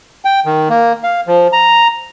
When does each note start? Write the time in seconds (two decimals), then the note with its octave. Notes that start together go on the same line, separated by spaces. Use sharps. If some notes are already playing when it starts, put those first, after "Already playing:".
0.25 G5
0.46 D#3
0.70 A#3
1.04 F5
1.27 F3
1.53 A#5